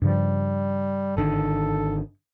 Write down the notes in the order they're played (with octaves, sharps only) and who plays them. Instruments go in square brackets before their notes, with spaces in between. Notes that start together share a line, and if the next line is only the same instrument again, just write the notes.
[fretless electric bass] G2 C#3 F3 [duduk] G3
[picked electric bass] G#1 D3 D#3 [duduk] A4